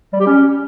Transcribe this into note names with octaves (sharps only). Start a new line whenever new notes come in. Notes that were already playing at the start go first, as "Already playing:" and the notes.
G3
G4
C#4